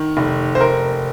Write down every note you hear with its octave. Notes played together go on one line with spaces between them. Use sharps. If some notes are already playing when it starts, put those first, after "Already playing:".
Already playing: D#3
F1
C5
A#4